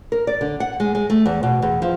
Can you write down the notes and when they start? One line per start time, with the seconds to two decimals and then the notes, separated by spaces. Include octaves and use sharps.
0.12 A#4
0.27 D5
0.41 D3
0.60 F#5
0.80 G#3
0.95 G#3
1.10 A3
1.26 E2
1.43 B2
1.62 E2
1.82 F3